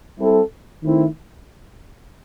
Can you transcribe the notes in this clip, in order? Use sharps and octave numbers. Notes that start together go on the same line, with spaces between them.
G3 C4 E4 A4
D#3 A3 C4 E4